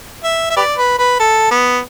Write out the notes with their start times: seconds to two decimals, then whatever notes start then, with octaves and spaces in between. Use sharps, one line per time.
0.24 E5
0.50 E5
0.57 G4 B4 D5
0.77 B4
0.98 B4
1.19 A4
1.51 B3